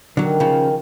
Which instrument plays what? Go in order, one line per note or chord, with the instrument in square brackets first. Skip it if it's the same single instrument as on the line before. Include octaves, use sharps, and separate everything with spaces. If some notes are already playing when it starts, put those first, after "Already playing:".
[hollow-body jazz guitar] D3 F#3 [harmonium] D#3
[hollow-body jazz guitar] C#3 F3